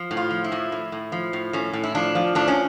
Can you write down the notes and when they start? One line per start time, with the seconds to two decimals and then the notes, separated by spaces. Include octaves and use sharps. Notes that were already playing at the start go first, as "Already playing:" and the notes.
Already playing: F3
0.11 A2
0.17 F4
0.31 F3
0.44 E4
0.52 A2
0.72 A2
0.92 A2
1.12 F3
1.33 A2
1.53 A2 C#4
1.73 A2
1.83 E4
1.95 F3 D4
2.15 F3
2.35 A2 D4
2.48 C#4